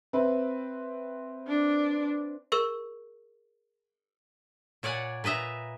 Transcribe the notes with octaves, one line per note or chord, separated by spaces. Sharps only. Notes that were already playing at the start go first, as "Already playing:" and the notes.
C4 B4 E5
D4
G#4 A#4 C#6 E6
A#2 C#5 D5 F#5 G#5
A#2 B4 D#5 E5 A#5